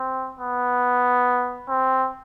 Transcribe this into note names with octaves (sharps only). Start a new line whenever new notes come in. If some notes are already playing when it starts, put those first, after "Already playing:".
Already playing: C4
B3
C4